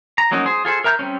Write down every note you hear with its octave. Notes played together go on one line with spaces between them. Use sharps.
A#5
F3 F#3 A#3 C#4 D#4
G#4 C5
F4 G#4 A4 C5
A#4 E5 A#5 F#6 G6
G3 C4 C#4